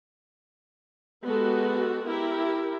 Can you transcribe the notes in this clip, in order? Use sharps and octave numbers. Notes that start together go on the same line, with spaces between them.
G#3 B3 F#4 G4 A4
E4 G4 A#4